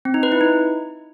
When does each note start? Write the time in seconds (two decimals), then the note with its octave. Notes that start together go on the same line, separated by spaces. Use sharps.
0.05 C4
0.14 D#4
0.23 B4
0.32 E4
0.41 D#4